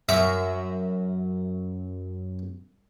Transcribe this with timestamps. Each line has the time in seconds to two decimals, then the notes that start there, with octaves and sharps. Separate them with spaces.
0.09 F#2 E5